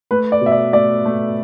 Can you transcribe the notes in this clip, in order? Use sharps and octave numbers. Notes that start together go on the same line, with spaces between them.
A3 B4
D5
B2 E5
D5
A3 D5
A3